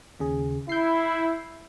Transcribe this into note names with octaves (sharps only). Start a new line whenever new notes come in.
D#2 C#3 G#4
E4 G6 C7